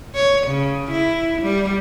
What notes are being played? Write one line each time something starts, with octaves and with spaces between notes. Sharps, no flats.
C#5
C#3
E4
G3